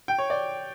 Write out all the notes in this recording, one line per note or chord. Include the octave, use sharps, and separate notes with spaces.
G5
C#5
D5